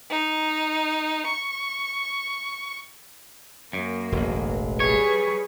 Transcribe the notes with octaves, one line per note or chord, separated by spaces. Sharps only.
D#4
C#6
F#2 A#3
E1 A1
G3 G#4 B4 C#5